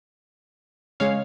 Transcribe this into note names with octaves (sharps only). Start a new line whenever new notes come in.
C#3 G#3 C#5 F5